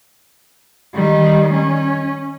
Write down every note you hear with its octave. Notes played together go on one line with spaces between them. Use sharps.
D#3 G3
C#4